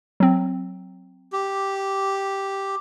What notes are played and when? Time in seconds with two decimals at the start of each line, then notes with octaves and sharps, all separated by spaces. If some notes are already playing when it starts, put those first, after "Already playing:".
0.20 F#3 C4
1.33 G4